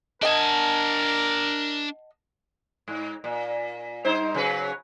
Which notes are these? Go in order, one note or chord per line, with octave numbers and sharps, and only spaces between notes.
D4 A#4 D#5 F#5 G#5 A5
G#2
A#2
G2 D#4 C5
C#3 F#3 B4